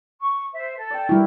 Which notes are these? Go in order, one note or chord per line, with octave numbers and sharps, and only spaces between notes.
C#6
C5 E5
A4
D5 G5
G3 E4 F#4 G4 A#4